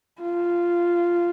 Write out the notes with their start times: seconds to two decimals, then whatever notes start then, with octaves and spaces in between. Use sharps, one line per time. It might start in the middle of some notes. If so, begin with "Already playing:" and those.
0.22 F4